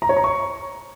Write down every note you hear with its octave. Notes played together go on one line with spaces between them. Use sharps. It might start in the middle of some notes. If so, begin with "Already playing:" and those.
A#5
C#5
A#5
C#6